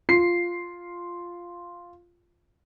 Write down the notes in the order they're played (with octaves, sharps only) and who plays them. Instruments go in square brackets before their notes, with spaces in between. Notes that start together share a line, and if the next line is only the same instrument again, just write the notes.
[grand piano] F4 C7